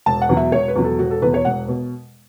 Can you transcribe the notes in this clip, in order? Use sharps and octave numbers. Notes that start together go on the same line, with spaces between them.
E1 A5
F#5
E2 B2 F#3
E5
E1 C#5
B4
E2 B2 F#3
A4
E1 F#4
A4
E2 B2 B4
C#5
E1 F#5
B2